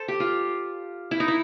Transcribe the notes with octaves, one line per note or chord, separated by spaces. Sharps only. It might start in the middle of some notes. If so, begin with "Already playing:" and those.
Already playing: A4 C5
G4
F4
E4
D#4
E4